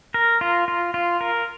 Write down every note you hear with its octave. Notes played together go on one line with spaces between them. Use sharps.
A#4
F4
F4
F4
A#4